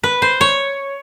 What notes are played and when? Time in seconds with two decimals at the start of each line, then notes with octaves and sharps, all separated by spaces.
0.04 B4
0.22 C5
0.41 C#5